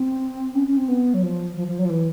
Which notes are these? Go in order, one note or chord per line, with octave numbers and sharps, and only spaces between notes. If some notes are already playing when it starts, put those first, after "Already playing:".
Already playing: C4
C#4
C#4
C4
B3
F#3
F3
F3
F3
F#3
F3
E3